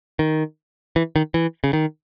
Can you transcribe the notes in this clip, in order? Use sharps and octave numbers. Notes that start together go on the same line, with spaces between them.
D#3
E3
D#3
E3
C#3
D#3